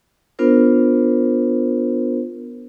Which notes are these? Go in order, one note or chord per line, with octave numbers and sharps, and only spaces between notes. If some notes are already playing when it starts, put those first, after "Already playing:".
B3 D4 F4 A#4 C5